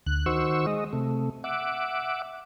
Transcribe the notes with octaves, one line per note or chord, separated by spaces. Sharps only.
D2 F#6
D#3 F#4 C5 C#6 E6
G#3 D#5
C3 A3
E5 F#5 D6